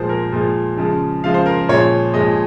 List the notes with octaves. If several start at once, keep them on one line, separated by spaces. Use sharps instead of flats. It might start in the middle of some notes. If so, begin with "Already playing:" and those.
Already playing: A#2 F3 G#3 C5
A#4
A#2 F3 G#3
C#3 F3 G#3
C#3 F3 G#3 F5
C5
A#4
A#2 F3 G#3 C#5
A#2 F3 G#3 D#5